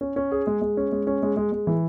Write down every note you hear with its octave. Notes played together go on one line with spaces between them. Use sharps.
C#4
C#4
G#4
G#3
G#3
C#4
G#3
C#4
G#3
G#3
G#3
E3